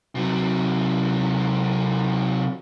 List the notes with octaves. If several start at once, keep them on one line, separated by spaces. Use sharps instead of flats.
C3 F#3